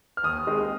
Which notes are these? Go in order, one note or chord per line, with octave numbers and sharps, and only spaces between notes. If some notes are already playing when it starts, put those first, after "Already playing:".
F6
D#2 D#6
D#3 G#3 C4